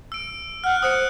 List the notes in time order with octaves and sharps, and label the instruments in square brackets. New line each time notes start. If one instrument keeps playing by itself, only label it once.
[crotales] E6 D7
[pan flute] F#5 [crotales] F6 F#6
[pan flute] C5 [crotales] D#6 F#6 C#7